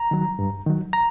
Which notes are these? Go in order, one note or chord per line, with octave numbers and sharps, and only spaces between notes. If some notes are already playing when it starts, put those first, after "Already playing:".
Already playing: A#5
D#3 F#3
G2
D#3 F#3
A#5